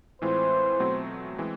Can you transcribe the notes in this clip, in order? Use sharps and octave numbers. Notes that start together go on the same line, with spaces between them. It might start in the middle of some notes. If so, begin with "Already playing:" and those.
A2 E3 G#3 C4 F4 C5
B2 F#3 A3 C4
E3 G#3 C4